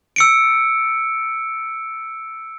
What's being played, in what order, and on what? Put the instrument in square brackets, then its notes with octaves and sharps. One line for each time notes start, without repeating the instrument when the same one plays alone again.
[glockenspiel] E6 C#7 D7